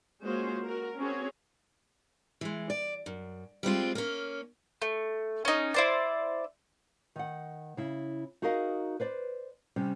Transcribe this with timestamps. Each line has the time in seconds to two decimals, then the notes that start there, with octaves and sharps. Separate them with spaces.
0.24 G#3 A#3 C#4 F4 F#4 C5
0.64 F#4 A#4
0.98 C4 C#4 F#4 G#4 C#5
2.41 E3 G#3
2.70 D5
3.06 F#2
3.63 G3 G#3 C4 F4
3.95 A#3 C#4
4.82 A3
5.45 C#4 D#4
5.74 E4 C5 D5
7.16 D#3 F#5
7.77 C#3 E4
8.42 D#4 F#4 G#4 A#4 D#5 F5
9.00 B4 C5 D5
9.76 C3 G3 C#4